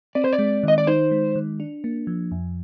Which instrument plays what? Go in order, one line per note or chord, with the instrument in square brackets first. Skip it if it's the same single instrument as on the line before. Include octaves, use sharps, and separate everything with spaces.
[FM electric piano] C4 [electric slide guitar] D5
[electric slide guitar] C5
D5
[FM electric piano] G#3
[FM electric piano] D#3 [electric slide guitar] D#5
[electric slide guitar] D5
[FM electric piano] D#4 [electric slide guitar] C5
[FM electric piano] G#3
D#3
D4
A#3
F3
F2